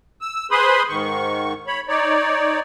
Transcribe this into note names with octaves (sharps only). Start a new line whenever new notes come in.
E6
G#4 B4 C5 B5 C6 D#6
G#2 D#3 C#6
C#5 B5
D#4 C#5 D5